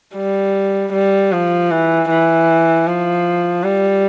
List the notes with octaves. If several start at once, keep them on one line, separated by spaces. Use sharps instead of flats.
G3
G3
F3
E3
E3
F3
G3